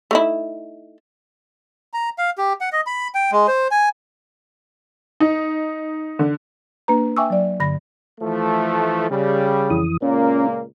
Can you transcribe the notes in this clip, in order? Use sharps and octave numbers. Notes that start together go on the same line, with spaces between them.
A3 D#4 E4
A#5
F5
G4
F#5
D#5
B5
G5
G#3
C5
G#5
D#4
D3
A#3 D4 B4 A#5
E5 G5 G#5 C#6 D6 E6
F#3 D5
G2 D3 B5 A#6
E3 F3 A3
C#3 G3
F2 E3 D#6
C#2 A#2 A#3 C#4